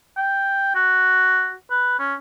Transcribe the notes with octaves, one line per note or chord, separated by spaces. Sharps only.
G5
F#4
B4
C#4